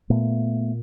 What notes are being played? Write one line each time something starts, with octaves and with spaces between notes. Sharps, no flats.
A#2 A3 B3